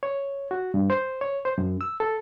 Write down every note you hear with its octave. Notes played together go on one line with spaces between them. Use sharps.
C#5
F#4
G2
C5
C#5
C5
F#2
E6
A4